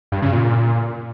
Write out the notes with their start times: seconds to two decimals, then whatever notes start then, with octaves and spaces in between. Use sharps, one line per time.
0.12 G2
0.22 C#3
0.33 A#2